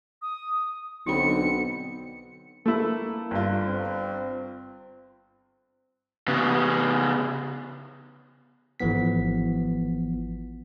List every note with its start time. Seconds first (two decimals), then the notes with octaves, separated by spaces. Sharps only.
0.22 D#6
1.07 B1 D3 C4 D#4 F#4 B5 C#7
2.66 A3 A#3 E4
3.31 G1 F4
3.65 C4
6.28 C#3 B3
8.80 G#1 E3 F3 B3 B6